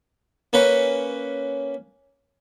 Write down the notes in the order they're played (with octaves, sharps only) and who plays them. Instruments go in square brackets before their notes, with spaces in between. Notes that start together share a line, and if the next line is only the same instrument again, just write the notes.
[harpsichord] A#3 C#4 B4